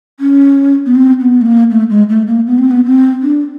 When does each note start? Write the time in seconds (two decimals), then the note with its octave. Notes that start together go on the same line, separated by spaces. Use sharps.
0.20 C#4
0.86 B3
0.95 C4
1.21 B3
1.42 A3
1.46 A#3
1.71 A3
1.90 G#3
2.09 A3
2.27 A#3
2.47 B3
2.58 C4
2.71 B3
2.85 C4
3.23 D4